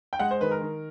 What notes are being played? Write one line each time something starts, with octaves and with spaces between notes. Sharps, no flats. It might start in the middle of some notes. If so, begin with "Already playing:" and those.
G5
G#3 F#5
C5
D#3 B4
A#4
D#3